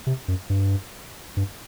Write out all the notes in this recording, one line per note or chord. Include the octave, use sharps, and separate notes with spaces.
C3
F#2
G2
G2